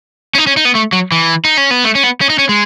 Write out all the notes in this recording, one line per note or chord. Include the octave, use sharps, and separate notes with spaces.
C#4
D#4
C#4
D#4
B3
A3
F#3
E3
D#4
C#4
B3
A3
C#4
B3
C#4
D#4
C#4
G#3